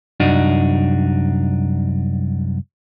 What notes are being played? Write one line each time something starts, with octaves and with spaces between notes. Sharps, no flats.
C2 F#2 D4 D#4 F#4